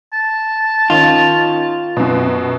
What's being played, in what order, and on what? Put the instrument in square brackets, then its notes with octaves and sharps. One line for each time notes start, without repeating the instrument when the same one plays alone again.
[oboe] A5
[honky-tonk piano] D#3 C#4 [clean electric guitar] F4
[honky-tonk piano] F#2 B2